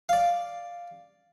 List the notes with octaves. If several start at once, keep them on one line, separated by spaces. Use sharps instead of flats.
D5 F5